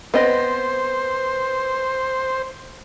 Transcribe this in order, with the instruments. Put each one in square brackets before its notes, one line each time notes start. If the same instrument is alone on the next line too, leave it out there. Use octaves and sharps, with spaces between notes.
[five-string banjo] B3 C4 D#5 [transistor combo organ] C5